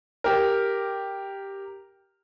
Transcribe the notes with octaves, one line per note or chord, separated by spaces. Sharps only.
G4 A#4